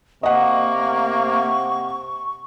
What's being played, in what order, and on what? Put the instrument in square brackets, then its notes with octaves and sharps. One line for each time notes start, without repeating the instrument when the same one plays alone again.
[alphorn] C3 [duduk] A#3 [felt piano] D#5 F#5 [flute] C#6